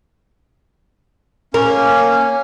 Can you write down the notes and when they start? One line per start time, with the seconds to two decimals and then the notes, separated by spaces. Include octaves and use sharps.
1.54 A#3 C#4 A#4